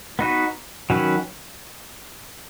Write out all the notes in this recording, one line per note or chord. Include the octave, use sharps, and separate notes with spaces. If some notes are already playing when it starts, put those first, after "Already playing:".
B3 D#4 F#4 B4
D#3 F#3 C#4 F#4 B4